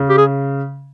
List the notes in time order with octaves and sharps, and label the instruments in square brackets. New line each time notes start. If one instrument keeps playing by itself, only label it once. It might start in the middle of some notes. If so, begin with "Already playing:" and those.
Already playing: [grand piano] C#3
[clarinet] G4
G#4